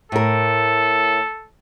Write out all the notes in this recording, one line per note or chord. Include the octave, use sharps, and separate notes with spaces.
A2 A4 A#4